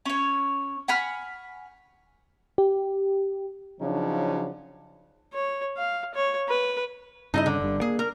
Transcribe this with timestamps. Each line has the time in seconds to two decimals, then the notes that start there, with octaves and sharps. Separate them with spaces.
0.05 C#4 C#5
0.88 F#5 G#5 B5 F6
2.58 G4
3.80 C#3 F3 F#3 D4 D#4
5.33 C#5
5.77 F5
6.14 C#5
6.49 B4
7.34 G2 C#3 D#4 E4 D#5
7.46 D3
7.60 G1 G2
7.81 A#3 G#4
7.99 A#4